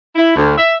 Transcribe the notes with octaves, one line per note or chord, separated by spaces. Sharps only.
E4
D2
E5